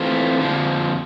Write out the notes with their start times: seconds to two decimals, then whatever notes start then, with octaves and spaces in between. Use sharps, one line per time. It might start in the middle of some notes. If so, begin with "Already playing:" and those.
Already playing: E3 A3 C4 F4
0.39 F2 D3 F3